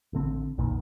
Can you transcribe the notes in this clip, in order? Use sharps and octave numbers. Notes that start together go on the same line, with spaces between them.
A1 D3 C4
B1 F2 A#2 D#3